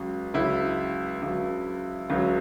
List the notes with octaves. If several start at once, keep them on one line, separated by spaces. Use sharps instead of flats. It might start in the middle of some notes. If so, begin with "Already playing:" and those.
Already playing: C#2 C#3 F#3
C#2 C#3 F#3 E4
C#2 C#3 F#3
C#2 C#3 F#3